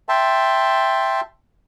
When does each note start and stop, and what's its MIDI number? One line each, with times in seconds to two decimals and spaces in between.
0.09 1.21 76
0.09 1.21 79
0.09 1.21 81
0.09 1.21 84